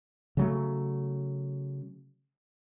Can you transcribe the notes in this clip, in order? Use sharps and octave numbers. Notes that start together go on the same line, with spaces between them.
C#3 F#3 A3